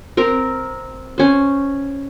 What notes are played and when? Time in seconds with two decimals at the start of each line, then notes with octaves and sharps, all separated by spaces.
0.17 C4 A#4
1.18 C#4 C5